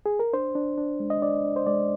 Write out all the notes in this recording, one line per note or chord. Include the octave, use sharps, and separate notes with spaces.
G#4
A#4
D4 C5
D4
D4
G#3
D#5
D4 D5
D4
C5
G#3 D5